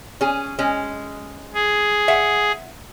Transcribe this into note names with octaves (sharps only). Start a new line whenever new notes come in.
C#4 G#4
G#3 C#4
G#4
E5 F#5